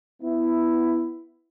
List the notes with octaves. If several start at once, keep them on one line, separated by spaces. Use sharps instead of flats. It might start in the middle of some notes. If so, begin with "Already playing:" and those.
B3 E4